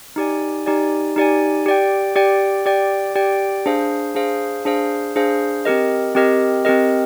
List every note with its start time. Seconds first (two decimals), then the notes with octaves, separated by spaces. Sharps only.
0.16 D#4 G4 D5 G#5
0.66 D#4 G4 D5 G#5
1.16 D#4 G4 D5 G#5
1.66 G4 D5 G5
2.16 G4 D5 G5
2.66 G4 D5 G5
3.16 G4 D5 G5
3.66 D4 G#4 C5 F5
4.15 D4 G#4 C5 F5
4.65 D4 G#4 C5 F5
5.16 D4 G#4 C5 F5
5.65 C4 G4 A#4 D#5
6.15 C4 G4 A#4 D#5
6.65 C4 G4 A#4 D#5